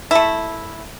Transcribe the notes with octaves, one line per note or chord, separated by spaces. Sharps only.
A3 E4